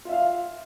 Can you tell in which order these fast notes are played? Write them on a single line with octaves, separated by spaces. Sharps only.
F4 E5 F5